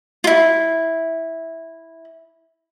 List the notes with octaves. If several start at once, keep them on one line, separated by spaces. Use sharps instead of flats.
E4 F4